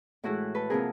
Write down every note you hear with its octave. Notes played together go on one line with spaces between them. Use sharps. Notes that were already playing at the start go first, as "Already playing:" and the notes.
A2 E3 G#3 E4 F#4
A4 B4
C3 F3 A#3 G#4 A#4